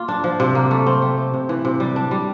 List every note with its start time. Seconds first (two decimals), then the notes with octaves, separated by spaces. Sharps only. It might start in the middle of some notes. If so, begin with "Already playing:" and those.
Already playing: A#3 F4
0.08 D4
0.24 F3
0.40 C3
0.55 A#3
0.71 A3
0.86 C4
1.02 A3
1.17 G4
1.34 C3
1.49 E3
1.65 C3
1.80 G3
1.96 D4
2.11 G3